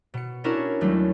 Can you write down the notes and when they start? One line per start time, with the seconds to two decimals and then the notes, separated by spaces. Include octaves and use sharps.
0.14 B2 C#7
0.44 C#4 D4 E4 F#4 A#4 C#5
0.81 D#2 F#3 G3 A3